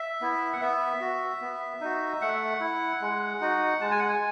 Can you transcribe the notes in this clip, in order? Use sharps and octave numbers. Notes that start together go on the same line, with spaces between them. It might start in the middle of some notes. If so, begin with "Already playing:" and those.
Already playing: E5
B3 E4
F#5
B3 E5
F#4
B3
D#4 F#4
A3 F#5
E4
G#3
D#4 F#4
G#3 A5
G#5
F#5
G#5